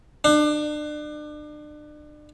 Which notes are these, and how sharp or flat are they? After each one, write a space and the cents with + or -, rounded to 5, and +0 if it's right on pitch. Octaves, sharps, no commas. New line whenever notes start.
D4 +35